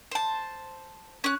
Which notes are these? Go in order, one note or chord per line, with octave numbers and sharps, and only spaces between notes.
C5 A5
C#4 F#6